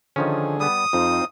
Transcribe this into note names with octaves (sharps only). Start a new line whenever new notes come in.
D3 D#3 F3 C#4 G#4
G3 B3 D#6
F2 C4 D#4 F4